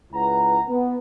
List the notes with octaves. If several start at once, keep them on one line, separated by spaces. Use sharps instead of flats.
C#2 E4 B4 F#5 A#5
B3